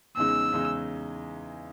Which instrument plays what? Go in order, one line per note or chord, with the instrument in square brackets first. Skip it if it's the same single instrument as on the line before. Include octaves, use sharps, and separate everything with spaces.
[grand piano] E2 C#3 G#3 D#4 [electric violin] E6
[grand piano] E2 C#3 G#3 D#4